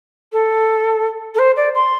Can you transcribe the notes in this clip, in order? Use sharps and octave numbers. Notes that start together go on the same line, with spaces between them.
A4
A4
C5
D5
C6